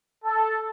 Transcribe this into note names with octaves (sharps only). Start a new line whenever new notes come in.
A4